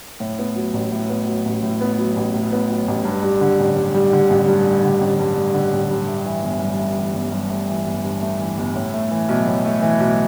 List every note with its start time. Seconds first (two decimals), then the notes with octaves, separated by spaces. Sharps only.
0.20 A2
0.39 B3
0.56 F#3
0.73 A1
0.92 A2
1.10 B3
1.27 F#3
1.45 A1
1.63 A2
1.81 B3
1.99 F#3
2.16 A1
2.34 A2
2.52 B3
2.70 F#3
2.88 A1
3.05 G2
3.23 G3
3.41 D3
3.59 A1
3.76 G2
3.94 G3
4.13 D3
4.30 A1
4.48 G2
4.65 G3
4.84 D3
5.01 A1
5.19 G2
5.37 G3
5.54 D3
5.73 A1
5.91 G2
6.08 A3
6.26 E3
6.43 G1
6.61 G2
6.79 A3
6.98 E3
7.14 G1
7.32 G2
7.50 A3
7.68 E3
7.87 G1
8.05 G2
8.22 A3
8.40 E3
8.58 G1
8.76 A2
8.93 A3
9.11 E3
9.29 B1
9.47 A2
9.65 A3
9.82 E3
10.00 B1